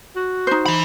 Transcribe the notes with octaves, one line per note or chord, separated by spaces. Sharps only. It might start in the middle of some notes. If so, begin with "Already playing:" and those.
F#4
D#4 C5
E3 B5